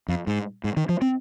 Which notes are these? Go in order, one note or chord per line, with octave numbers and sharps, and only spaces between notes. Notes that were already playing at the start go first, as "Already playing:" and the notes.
F2
G#2
G#2
D#3
F3
C4